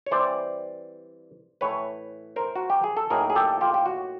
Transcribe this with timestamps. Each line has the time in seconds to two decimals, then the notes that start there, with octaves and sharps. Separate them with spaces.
0.06 C#5
0.11 E3 G3 C4 C5 D5
1.61 A2 E3 A3 B4 C#5
2.36 A#4 C5
2.56 F#4
2.70 G4
2.84 G#4
2.97 A4
3.10 A2 F#3 A#3 D#4 G#4 A#4
3.30 G#4
3.35 G4 A4
3.61 F4 G4
3.74 G4
3.86 F#4